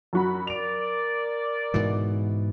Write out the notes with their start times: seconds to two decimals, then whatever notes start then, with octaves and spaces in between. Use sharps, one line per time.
0.13 F#2 F#4 B5
0.47 A#4 D5 D7 F7
1.74 G#2 B2 E3